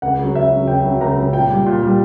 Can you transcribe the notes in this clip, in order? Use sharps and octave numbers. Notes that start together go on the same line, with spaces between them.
C#2 F#5
C#3 F#3
C#2 E5
C#3 F#3
C#2 G5
C#3 F#3
C#2 A#5
C#3 F#3
A#2 G5
G3
A#2
G3